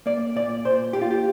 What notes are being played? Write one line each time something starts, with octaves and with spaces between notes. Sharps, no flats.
A#3 D5
A#2 D5
A#2 C5
A#3 G4
F4
G4